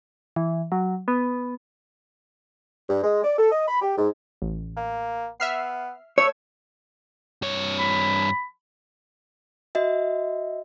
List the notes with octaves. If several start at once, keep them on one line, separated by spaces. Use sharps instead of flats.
E3
F#3
B3
G2
G#3
D5
A4
D#5
B5
G4
G#2
A1
A#3
B3 E5 F6 C7
A3 C#5 E6 G#6
G2 C#5
B5
F#4 D#5 E5